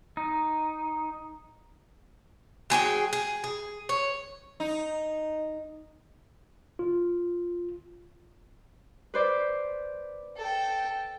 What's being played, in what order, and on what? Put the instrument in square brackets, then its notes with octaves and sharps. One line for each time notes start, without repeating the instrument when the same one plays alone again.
[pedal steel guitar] D#4
[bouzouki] F#3 G#4 B4 G5
G#4
G#4
C#5
[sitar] D#4
[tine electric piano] F4
[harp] B4 C5 D5
[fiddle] A4 G5